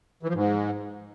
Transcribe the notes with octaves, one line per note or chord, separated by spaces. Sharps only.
E3
F3
G#2